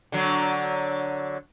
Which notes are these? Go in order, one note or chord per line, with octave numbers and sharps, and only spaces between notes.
D3 F#3